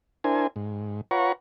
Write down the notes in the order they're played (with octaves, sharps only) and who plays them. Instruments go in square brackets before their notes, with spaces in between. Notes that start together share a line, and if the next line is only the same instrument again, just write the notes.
[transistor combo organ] D4 E4 A#4 C5 G#5
G#2
F4 B4 C#5 F#5 A#5 C#6